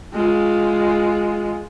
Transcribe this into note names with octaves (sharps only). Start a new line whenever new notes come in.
G#3 F4